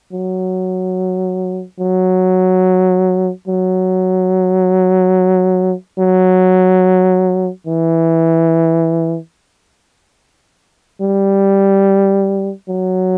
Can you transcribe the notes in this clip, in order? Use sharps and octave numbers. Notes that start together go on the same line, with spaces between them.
F#3
F#3
F#3
F#3
E3
G3
F#3